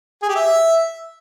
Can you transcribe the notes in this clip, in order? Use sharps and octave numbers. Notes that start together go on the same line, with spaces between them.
G#4
G4
E5